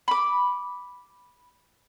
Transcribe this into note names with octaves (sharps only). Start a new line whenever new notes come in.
B5 D6